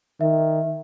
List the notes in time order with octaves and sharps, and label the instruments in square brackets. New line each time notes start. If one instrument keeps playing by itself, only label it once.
[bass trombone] D#3 [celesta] E5